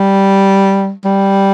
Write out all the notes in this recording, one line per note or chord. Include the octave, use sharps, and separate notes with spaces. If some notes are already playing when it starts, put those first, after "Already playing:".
Already playing: G3
G3